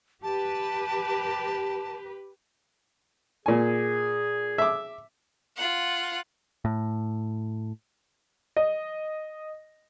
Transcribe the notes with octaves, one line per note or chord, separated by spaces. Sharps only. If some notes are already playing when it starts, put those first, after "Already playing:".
G4 B4 A5
A#2 G#4 G#5
E5 D6
F4 F#5
A2
D#5